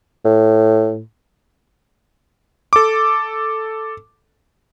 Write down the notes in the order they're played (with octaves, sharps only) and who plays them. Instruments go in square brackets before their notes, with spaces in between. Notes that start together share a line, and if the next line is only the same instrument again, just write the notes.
[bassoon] A2
[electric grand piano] A4 D6